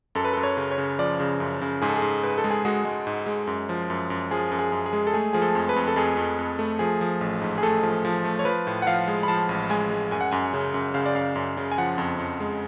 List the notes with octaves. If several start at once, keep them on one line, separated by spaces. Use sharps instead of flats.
F#2 A4
B4
F#2 A4
C#5
C#3
C#5
C#3
F3 D5
C#3
F#2
C#3
G#2 G#4
A4
G#4
G#2
G#2 B4
A4
G#3
G#4
G#3 F#4
G#3
G#2
G#3
F#2
F3
F#2
F#2
F3 G#4
F#2
G#4
F#2
G#4
G#3
A4
A3 G#4
F3 G#4
A4
F2
B4
F2
A4
F2 G#4
F2
F2
A3
F3 G#4
F3
A1
G#2
G#4
A3 A4
F3
F3
A3
C#5
F3 B4
A2
F#5
F3 F5
G#3
B5
F3 A5
A1
G#3 G#5
G#3
F#2 G#5
F#5
F#2 G#5
C#3
F#2
C#3 F5
D5
F#2 F5
F#2
C#3
G#5
F3 F#5
F2
F2
G#3